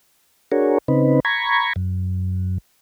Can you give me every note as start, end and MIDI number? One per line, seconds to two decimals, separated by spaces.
0.52 0.78 62
0.52 0.78 66
0.52 0.78 68
0.52 0.78 70
0.52 0.78 73
0.88 1.20 49
0.88 1.20 60
0.88 1.20 63
0.88 1.20 71
1.25 1.73 82
1.25 1.73 83
1.25 1.73 85
1.25 1.73 92
1.76 2.58 42